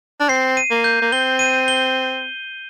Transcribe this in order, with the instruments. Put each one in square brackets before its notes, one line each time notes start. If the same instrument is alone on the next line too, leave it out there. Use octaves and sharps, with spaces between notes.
[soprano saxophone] D4
[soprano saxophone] C4 [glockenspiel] C7
[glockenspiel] D#7
[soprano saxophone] A#3
[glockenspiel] G6
[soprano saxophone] A#3
[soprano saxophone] C4 [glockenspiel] G7
[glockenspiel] D#7
G7